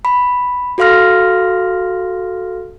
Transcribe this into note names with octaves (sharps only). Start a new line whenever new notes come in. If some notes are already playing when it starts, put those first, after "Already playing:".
B5
F#4 A4 F5 C6 F6 A#6